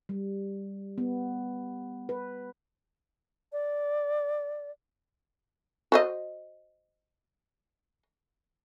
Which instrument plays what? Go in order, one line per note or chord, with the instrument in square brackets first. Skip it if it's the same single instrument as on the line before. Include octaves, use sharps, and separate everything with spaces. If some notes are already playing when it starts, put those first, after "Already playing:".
[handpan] G3
B3
B4
[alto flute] D5
[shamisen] F#4 C5 D#5